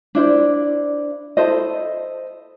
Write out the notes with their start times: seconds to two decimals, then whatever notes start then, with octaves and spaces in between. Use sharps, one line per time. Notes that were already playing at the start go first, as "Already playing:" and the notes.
0.15 D4 E4 C5 D5
1.37 E4 A4 C5 D#5